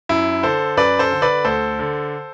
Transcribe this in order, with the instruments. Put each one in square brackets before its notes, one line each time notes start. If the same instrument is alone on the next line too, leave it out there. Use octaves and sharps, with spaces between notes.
[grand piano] F#2 E4
D3 A4 C5
F#2 B4 D5
A4 C5
D3
B4 D5
D2 A4 C5
D3